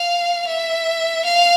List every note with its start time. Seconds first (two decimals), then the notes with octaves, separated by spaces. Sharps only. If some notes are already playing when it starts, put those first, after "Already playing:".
Already playing: F5
0.47 E5
1.25 F5